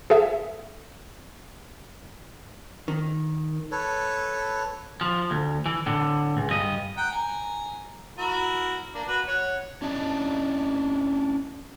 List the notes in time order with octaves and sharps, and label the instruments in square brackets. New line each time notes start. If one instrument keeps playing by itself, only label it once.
[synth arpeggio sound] G#4 A4 E5
[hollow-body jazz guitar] D#3
[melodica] A4 B4 C#5
[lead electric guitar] F3
D2
E3
A2 D3
C#2
G2 D#5
[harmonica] F#5 G5 A#5
G#5 A#5
E4 F#4 A#4
A#3 D4
F#4 B4
C#5 F#5
[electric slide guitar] C#4 D4 E4 D#5 A5